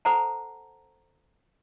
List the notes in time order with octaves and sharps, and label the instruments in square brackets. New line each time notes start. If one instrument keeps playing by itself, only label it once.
[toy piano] A4 C5 F#5 A5 A#5